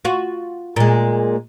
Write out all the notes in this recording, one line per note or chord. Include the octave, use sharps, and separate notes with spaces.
F4 F#4
A#2 G#3